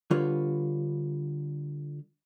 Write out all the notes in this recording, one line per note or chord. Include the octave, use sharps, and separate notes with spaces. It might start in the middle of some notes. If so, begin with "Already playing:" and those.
D3 G3 F4 B4 C#5